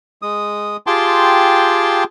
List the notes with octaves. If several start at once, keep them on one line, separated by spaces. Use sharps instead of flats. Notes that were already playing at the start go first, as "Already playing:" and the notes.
G#3 D#6
F4 G4 G#4 G5 A5 C6